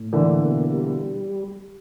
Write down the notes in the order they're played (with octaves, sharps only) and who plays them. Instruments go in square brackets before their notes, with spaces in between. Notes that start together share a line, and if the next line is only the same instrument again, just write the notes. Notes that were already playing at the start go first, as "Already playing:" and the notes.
Already playing: [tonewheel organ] A2
[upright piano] D3 E3 [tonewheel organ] A#3
[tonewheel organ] B2
G3